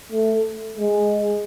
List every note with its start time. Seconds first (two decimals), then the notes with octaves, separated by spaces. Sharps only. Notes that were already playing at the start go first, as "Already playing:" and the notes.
0.12 A3
0.78 G#3